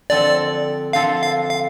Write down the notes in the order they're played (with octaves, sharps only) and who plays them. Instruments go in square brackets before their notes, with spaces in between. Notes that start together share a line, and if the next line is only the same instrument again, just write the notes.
[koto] D3 F3 C4 A4 [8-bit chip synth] D5
[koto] D3 F3 C4 A4 [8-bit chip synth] F5
[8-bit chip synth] F5
F5